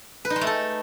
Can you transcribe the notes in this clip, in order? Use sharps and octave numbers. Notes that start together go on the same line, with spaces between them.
B4
D#4
G#3
A3
A4